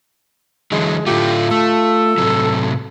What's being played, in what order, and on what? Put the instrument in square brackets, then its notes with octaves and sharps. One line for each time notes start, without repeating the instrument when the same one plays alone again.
[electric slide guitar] D3 E3 F#3 [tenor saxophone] G#3
[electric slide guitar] A2 D3 A3 [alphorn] F4 [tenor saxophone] G4
[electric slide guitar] A3 [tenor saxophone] A4
[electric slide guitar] A2 C3 F#3